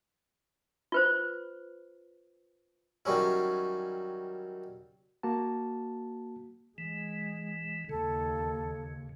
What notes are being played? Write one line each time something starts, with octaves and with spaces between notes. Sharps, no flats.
F4 B4 C5
D#3 F#3 G3 C#4 E4
A#3 F#4 A5
E3 G#3
D#2 C#3 A4